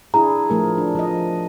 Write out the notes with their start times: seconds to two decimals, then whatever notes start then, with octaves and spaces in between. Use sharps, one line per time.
0.14 D4 E4 G#4 A#5
0.50 F3 A3 A#4
0.78 D4
0.95 F3 D#5